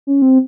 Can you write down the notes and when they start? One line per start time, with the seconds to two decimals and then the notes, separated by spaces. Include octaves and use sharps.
0.07 C#4
0.22 C4